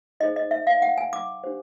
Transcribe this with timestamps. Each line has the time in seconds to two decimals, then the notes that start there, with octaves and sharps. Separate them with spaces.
0.20 D#4 G#4 C5 D#5
0.36 D#5
0.51 E5
0.67 F5
0.82 F#5
0.98 G#5
1.13 D6
1.44 D4 G4 C5